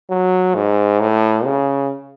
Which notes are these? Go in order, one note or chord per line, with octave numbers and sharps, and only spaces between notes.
F#3
G#2
A2
C#3